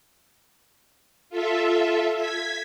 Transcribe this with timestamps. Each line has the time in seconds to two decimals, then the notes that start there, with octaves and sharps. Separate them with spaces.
1.30 F4 A4 E5
2.17 G#6 B6